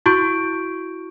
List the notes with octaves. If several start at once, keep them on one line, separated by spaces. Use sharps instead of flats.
E4 F#4 C#6 G6 D7